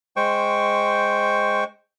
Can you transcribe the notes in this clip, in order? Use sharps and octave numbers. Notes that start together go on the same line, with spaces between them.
G#3 C5 G5 C#6